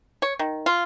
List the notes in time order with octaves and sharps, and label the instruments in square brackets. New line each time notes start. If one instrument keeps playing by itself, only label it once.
[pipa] C#5
D#3
F4